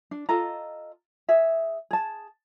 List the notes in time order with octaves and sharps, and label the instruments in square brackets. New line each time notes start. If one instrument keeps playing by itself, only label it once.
[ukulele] D4
F4 A4 D#5 A#5
G#4 E5
G#4 A5